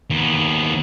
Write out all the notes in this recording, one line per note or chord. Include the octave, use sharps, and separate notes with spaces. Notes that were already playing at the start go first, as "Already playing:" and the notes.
D#2 B3